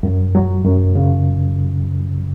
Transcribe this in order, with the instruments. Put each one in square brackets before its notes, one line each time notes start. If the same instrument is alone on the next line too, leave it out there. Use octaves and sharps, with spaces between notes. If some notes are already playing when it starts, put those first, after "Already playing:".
[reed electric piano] F#2
F#3
F#2
C#3